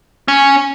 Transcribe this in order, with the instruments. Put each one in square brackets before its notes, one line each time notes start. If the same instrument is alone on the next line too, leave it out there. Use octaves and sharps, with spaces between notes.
[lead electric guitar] C#4